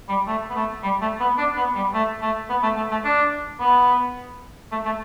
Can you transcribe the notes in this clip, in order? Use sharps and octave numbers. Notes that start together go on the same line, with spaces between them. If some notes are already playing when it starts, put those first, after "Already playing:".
G3
A3
B3
A3
G3
A3
B3
D4
B3
G3
A3
A3
B3
A3
A3
A3
D4
B3
A3
A3